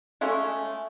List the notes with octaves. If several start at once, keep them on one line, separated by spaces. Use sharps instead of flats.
G#3 A3 C#4 F4